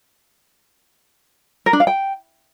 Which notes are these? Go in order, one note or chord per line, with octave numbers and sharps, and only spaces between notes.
A#4
D4
F5
G5